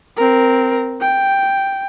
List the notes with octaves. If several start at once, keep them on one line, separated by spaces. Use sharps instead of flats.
C4 A#4
G5